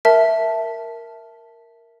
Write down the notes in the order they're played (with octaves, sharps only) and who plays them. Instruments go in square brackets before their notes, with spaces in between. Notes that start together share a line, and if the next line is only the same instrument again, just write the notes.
[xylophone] A#4 E5 A5